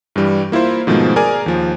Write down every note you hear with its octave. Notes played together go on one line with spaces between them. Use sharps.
G2 E3 G3
A#3 E4 F4 C5
G#2 B2 D#3 F3 G#3 A3
G#4 A#4 D5 G#5
D#2 F3